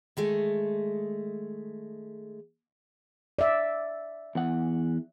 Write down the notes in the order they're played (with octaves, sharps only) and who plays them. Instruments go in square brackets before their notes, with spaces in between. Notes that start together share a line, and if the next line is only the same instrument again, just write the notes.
[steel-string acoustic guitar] D#3 G#3 A3
[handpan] D5 E5
[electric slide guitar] E2 F#5